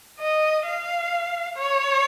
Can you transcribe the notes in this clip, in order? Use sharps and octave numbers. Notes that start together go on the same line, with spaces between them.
D#5
F5
C#5